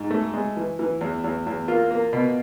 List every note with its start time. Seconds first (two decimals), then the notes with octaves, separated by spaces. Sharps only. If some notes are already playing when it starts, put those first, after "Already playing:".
Already playing: G#2
0.11 A3
0.34 G#3
0.57 E3
0.79 E3
1.01 E2
1.24 E2
1.46 E2
1.68 A#3 F4
1.91 A#3
2.13 B2